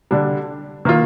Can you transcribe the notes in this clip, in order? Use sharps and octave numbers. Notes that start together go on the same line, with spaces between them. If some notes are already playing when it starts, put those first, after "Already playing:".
D3 G3 D4
D#3 A#3 F4